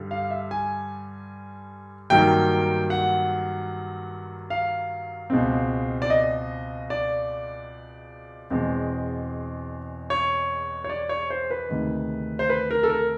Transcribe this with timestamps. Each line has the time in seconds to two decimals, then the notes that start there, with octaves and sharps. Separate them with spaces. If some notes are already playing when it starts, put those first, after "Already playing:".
Already playing: G2 D3 G3
0.11 F5
0.30 E5
0.51 G#5
2.10 G2 D#3 F#3 A#3 G5
2.90 F#5
4.50 F5
5.30 C#2 B2 G#3 C4
6.02 D5
6.10 D#5
6.90 D5
8.50 E2 B2 G#3 C4
10.10 C#5
10.84 C#5
10.89 D5
11.09 C#5
11.30 C5
11.51 B4
11.69 D2 C3 D#3 G#3
12.39 C5
12.49 B4
12.71 A#4
12.83 A4
12.90 A#4